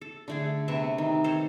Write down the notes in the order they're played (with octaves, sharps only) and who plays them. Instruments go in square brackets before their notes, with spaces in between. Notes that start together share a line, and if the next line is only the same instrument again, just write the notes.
[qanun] A4
D3 A3 G#4
C3 B3 E5 C#6
D#3
A4 C5 C#5